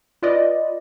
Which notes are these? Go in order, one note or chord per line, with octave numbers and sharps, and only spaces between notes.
F4 B4 D5 D#5